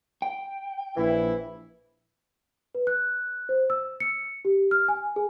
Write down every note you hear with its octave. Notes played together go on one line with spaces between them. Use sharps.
G5
A#1 E3 E4
B4
F#6
C5
E6
C#7
G4
F6
G#5
G#4